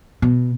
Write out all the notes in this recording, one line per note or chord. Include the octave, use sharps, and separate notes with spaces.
B2